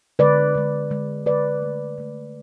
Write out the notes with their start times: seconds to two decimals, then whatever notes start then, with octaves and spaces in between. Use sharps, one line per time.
0.19 D3 G#3 B4 D5
0.55 D3 G#3
0.90 D3 G#3
1.26 D3 G#3 B4 D5
1.62 D3 A3
1.98 D3 A3